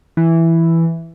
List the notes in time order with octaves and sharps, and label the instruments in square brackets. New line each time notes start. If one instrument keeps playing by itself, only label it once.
[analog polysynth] E3